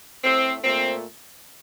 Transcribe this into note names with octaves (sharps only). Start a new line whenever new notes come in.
A2 A3 C4
A#2 A3 C4